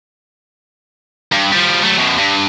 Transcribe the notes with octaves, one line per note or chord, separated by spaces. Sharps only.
G2
F3 G3
F#3 A3
F#2 B2
G2